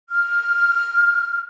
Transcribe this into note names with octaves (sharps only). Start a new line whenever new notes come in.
F6